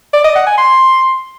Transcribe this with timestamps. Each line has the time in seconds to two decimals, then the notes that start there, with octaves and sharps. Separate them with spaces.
0.13 D5
0.24 D#5
0.35 F#5
0.47 G#5
0.58 C6